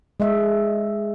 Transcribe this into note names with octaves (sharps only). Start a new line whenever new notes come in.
G#3 D#5 E5